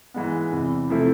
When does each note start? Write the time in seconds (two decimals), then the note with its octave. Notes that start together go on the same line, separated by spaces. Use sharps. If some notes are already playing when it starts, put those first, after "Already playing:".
0.14 G#2 E3 G#3 B3
0.52 E2 C3 E3
0.89 C3 F3 A3 C4 E4